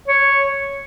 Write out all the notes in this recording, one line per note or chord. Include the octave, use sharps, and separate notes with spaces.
C#5